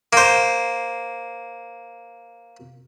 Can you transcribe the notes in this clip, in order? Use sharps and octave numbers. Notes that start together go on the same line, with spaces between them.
A#3 C5